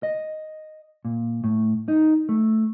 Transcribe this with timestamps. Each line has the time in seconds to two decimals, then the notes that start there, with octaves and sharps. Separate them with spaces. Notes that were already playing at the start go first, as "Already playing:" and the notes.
0.03 D#5
1.05 A#2
1.44 A2
1.88 D#4
2.29 A3